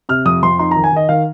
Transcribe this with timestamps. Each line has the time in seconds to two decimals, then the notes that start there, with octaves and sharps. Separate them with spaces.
0.09 C3 F6
0.25 F2 D#6
0.43 F2 C6
0.59 D#4 C6
0.71 A#5
0.76 D#3
0.84 G#5
0.92 D#3 D#5
1.09 D#3 F5